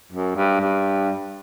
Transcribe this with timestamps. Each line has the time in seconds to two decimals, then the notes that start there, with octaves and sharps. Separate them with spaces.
0.12 F#2
0.36 G2
0.60 G2